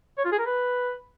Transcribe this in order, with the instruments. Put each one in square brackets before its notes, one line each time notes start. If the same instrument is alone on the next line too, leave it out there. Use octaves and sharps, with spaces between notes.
[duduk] C#5
F4
G#4
A#4
B4